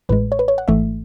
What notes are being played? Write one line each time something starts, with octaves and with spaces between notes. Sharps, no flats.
A1 A2 G#3 B4
C#5
B4
C#5
F#5
G#1 G#2 E3 A3 E5